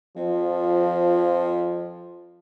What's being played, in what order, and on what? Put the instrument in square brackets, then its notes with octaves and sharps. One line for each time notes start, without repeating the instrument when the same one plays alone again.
[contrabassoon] F2 [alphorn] F3